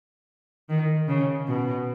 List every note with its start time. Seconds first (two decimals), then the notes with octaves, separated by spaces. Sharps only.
0.69 D#3
1.08 C#3
1.48 B2